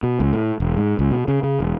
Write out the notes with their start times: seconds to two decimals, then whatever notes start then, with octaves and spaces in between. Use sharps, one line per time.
0.03 B2
0.20 C#2
0.33 A2
0.60 E1
0.77 G#2
0.99 C#2
1.11 B2
1.28 C#3
1.43 C#3
1.60 E1